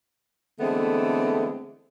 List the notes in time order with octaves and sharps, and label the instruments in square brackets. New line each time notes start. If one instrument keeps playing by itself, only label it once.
[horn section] D3 E3 G#3 A3 B3 C4